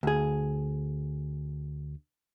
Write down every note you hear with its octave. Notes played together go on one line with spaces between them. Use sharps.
D2 G#4